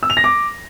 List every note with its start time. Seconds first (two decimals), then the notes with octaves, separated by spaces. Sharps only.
0.03 E6
0.10 F7
0.17 A#6
0.24 D6